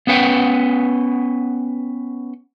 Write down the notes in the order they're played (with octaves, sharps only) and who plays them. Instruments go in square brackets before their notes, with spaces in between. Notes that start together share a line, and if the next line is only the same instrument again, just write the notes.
[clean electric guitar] B3 C#4 B4 F#5 G5